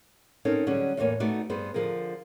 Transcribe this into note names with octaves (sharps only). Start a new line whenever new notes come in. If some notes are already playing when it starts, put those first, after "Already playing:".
C4 C#4 D#4 A4 A#4 C#5
D3 F#3 G3 C#4 G#4
E2 A2 A3 A#3 C#5 G#5
A3 B3 D#4 F#4 D5
G2 B3 G#4 C5
D3 F3 G#4 A#4